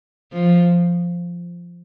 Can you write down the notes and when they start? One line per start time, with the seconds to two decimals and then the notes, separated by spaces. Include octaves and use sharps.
0.32 F3